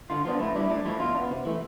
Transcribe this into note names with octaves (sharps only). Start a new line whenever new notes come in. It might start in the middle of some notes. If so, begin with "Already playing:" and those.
D3 F4
F3 B3 D4 F4
A2 E4
G3 D4 E4
A2 D4
F3 A3 E4
B2 F4
D4
B3
C3
E3 A3